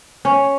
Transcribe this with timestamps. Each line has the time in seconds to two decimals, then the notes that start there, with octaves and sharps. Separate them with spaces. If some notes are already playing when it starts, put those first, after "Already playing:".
0.25 C#4